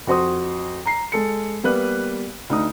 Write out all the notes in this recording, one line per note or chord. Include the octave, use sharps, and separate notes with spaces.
F2 F#4 C5 C6 D#6
A#5 C7
G#3 A4 C#7
G3 A#3 B3 B4 F#6
D2 D#4 D#6